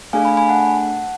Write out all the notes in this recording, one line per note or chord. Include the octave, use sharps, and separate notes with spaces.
A3 D4 G#4 F5 G#5
G#5 B5
G#5 B5
F#5 A5